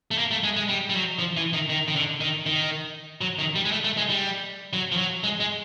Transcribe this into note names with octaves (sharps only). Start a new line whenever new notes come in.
A3
A#3
A3
G#3
G#3
G3
G3
F#3
F3
E3
D#3
D#3
D#3
D3
D#3
D#3
F#3
D#3
G3
G#3
A3
A3
G#3
G3
F#3
F3
F#3
G#3
G#3